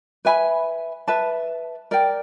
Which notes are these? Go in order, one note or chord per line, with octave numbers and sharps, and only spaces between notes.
B4 E5 G#5 B5
B4 E5 A5
A#4 D5 G5